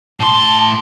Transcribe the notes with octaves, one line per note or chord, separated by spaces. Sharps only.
A2 A5 C6